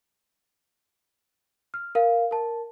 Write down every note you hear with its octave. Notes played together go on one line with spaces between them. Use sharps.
F6
A#4 F5
A#4 A5